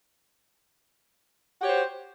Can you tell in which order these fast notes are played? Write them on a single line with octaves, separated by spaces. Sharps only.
F#4 G4 C#5 C5